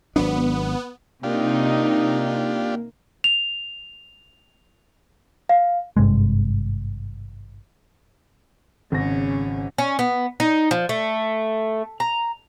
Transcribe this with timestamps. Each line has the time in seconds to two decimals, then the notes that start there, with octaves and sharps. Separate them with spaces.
0.16 G#1 F#3 B3 D4
1.23 C3 A#3 D4 D#4 F4 G4
3.24 F7
5.49 F5
5.97 G#1 G2 C3 G#3
8.92 G#1 C#3 C#4 A#6
9.78 C#4
9.99 B3
10.40 D#4
10.71 F3
10.89 A3
12.00 A#5